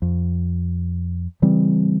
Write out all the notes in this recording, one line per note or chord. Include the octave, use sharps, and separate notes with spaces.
F2
C#3 E3 G3 C4